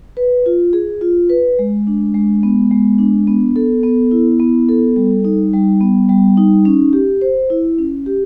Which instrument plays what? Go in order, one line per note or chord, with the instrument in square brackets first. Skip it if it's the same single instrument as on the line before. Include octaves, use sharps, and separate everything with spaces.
[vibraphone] B4
F4
G#4
F4
B4
G#3
D4
G#3
B3
G#3
D4
B3
A4
B3
E4
B3
A4
G3
D#4
G3
B3
G3
D#4
C#4
G4
C5
E4
C#4
G4